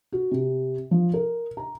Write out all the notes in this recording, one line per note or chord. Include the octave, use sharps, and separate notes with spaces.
F#4
C3
F3
A#4
A#5